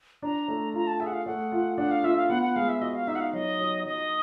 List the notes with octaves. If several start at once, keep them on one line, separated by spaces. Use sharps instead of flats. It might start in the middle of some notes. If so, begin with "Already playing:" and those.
D4 A#5
A3
F4 A#5
A5
G#4 E5
F#5
F5
A3 F#5
F4
D4 F#5
F5
F4 E5
F5
B3 F#5
F#5
G#3 F5
E5
F#4 D#5
F5
D#4 E5
F#5
F5
F#3 D#5
F#3
F#3 D#5